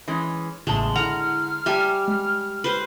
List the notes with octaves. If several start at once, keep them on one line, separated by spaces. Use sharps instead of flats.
E3 G#3 C#4
A1 E2 A2 C#3 G#3 A5
D3 E4 F#5 A#5 F6
G3 E5 G#5 A5
G#3
B4 C5